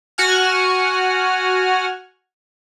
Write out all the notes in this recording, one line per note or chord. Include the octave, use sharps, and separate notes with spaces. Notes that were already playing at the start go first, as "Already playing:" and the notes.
F#4 F#5 G#5 F6